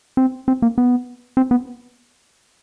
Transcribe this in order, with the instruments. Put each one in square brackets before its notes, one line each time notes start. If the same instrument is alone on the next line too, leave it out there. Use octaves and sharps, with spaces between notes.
[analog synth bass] C4
C4
A#3
B3
C4
B3